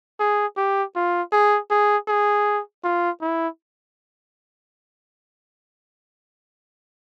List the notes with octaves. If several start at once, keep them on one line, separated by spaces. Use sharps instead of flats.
G#4
G4
F4
G#4
G#4
G#4
F4
E4